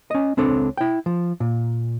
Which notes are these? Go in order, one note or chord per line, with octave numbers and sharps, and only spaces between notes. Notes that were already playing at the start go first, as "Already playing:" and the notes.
C#4 D#5
C#2 C4 D4 A4 C#5
E4 G5
F3
A#2